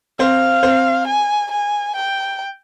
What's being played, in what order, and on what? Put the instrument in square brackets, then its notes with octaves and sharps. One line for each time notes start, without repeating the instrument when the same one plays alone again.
[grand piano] C4 C5 [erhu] F5
[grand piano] C4 C5
[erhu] G#5
G#5
G5